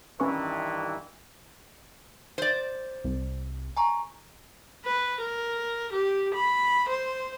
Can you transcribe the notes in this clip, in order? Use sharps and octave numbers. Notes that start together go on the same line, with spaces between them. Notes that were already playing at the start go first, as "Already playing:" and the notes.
G2 D#3 E3 C#4 B4 C#6
C5 D5
C2
G#5 A#5 C#6
B4
A#4
G4
B5
C5